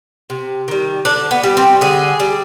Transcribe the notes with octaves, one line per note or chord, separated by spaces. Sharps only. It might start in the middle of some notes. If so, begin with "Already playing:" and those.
C3
D#3 G3
D3 D4
B3
G3
C4
D3 G#4
G3